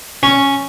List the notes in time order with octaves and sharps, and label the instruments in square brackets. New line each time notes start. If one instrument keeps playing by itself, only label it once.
[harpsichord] C#4